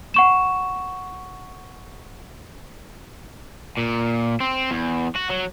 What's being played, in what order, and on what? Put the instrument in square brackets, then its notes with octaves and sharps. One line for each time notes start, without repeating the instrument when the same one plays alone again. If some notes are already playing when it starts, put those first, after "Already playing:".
[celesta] F#5 C#6 E7
[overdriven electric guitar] A#2
C4
E2
F#4
F#3